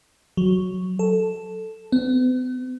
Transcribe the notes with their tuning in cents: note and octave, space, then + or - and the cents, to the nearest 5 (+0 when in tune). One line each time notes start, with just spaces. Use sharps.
F#3 -5
A4 +0
B3 +45